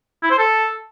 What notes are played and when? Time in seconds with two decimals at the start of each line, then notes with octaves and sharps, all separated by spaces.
0.23 E4
0.31 C5
0.38 A4